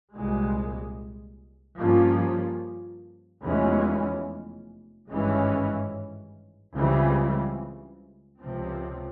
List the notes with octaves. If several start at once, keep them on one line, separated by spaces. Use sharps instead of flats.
C2 A#2 G#3
G2 F3 A#3 C#4
F1 E2 E3 G#3 C#4
G#1 G2 E3 G#3 C#4
C#2 C#3 E3 G3 C4
C#2 C3 F3 C4